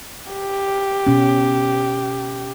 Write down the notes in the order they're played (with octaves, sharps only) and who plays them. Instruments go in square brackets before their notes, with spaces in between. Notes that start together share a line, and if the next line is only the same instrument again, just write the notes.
[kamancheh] G4
[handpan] B2 C#4